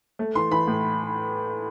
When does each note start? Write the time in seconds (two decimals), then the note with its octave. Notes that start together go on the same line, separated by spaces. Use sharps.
0.19 A3
0.35 E3 C6
0.51 E3 B5
0.67 A2